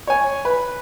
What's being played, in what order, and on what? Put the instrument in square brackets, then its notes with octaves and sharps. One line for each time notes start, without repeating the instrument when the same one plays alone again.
[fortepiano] C#5 G#5
B4